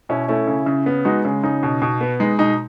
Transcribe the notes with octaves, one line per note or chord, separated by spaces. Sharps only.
B2 C#4 E4
A3 C#4 E4
C#3
C#3
B3
G#3 D#4 F#4
C#3
C#3 D#4
B2
B2
B3
G#3 D#4
B2 D#4